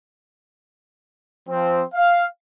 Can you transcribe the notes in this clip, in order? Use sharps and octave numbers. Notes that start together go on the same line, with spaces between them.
F3 C4
F5